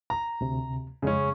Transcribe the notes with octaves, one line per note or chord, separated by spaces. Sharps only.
A#5
D2 C3
F2 C#3 G#3 C#4